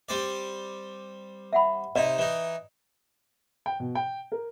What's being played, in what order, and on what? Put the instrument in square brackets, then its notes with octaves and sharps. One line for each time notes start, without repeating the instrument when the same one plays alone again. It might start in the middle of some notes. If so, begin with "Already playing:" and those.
[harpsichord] G3 C4 D5
[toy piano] E5 F#5 B5
[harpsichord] C3 D#4 [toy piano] D5 D#5 F5
[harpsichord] E3 D#4
[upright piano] G5
B2
G5
A#4